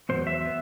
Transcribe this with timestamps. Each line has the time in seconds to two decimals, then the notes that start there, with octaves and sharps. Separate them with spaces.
0.09 E2 D#3 F#3 B3 C5
0.27 E5
0.46 B3